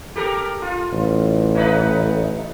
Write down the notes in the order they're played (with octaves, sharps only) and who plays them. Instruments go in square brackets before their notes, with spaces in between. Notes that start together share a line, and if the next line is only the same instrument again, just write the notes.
[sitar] G4 A4 A#4
F4
[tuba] A1
[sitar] A3 D#4 B4